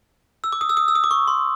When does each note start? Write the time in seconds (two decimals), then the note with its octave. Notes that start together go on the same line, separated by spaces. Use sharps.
0.44 E6
0.52 D6
0.61 D#6
0.69 E6
0.77 D#6
0.88 E6
0.95 D#6
1.04 D6
1.11 C#6
1.28 C6